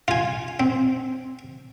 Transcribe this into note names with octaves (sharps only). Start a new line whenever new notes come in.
F4 G#5
C4